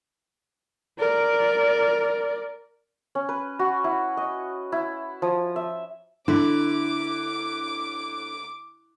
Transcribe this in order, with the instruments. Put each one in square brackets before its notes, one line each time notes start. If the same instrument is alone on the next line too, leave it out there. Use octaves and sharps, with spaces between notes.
[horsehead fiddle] A#4 D5
[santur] C#4
B4
F#4
E4
D#5
E4
F3
E5
[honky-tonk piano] D3 [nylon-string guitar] E4 [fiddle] D6